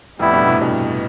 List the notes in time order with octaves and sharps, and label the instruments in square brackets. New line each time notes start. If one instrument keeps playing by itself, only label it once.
[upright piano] F2 A2 [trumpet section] G3 B3 E4
[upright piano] G2 B2
A2 C3
G2 B2